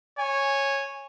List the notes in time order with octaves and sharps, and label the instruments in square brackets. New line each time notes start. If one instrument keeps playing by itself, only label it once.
[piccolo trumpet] C#5 [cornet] G#5